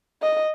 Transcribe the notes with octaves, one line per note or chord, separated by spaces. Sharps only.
D#5